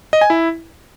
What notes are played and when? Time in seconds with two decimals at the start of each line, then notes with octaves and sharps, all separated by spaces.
0.13 D#5
0.21 G#5
0.30 E4